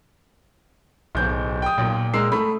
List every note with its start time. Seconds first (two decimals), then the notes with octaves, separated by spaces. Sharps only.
1.15 D1 B1 G6
1.62 G5 D#6
1.78 B1 A#2
2.14 G#3 A#4 E6 C7
2.32 A3 B5